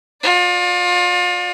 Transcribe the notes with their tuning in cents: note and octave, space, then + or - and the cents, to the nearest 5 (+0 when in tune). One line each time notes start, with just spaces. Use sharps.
F4 +35 D5 +0